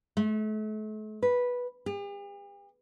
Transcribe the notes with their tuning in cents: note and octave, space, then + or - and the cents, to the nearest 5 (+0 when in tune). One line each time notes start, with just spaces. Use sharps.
A3 -40
B4 -10
G4 +45